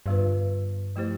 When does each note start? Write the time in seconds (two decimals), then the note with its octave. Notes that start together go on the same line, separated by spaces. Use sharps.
0.06 G2 D3 G3 B3 F4 B4
0.96 F3 A3 E4 G4 C5